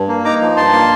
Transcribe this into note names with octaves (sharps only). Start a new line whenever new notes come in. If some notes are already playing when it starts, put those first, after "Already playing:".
Already playing: G2
A#3
D#4 A#5 D6
F3
G2 A5 C6
A#3